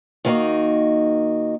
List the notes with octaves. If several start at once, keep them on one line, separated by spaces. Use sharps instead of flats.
D#3 A#3 D#4 F#4